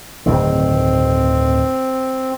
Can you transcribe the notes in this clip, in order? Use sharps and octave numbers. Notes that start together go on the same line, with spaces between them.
D1 G2 D#3 C4